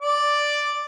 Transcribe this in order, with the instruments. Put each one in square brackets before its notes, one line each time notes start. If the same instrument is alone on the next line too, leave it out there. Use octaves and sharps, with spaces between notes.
[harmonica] D5 D6